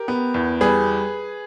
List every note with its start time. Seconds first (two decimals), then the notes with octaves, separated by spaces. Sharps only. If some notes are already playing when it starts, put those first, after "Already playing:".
Already playing: G4 A#4
0.08 B3
0.34 E2
0.61 G3 G#4 B4